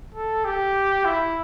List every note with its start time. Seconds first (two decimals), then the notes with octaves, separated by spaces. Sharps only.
0.15 A4
0.45 G4
1.05 E4